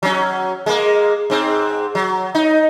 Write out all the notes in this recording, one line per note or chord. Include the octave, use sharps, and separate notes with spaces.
F#3 C#4
G#3 A#3
G#2 C4
F#3
D#4